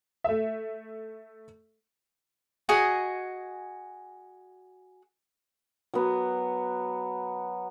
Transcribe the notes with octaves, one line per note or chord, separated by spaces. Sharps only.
A3 E5
F#4 G#4 D#5 G#5
F#3 B3